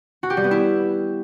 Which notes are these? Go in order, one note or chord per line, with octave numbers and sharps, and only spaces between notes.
F#4
G4
G3
B3
E4